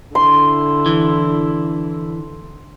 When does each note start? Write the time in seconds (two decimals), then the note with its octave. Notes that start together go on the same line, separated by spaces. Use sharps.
0.15 D3 E4 C6
0.86 E3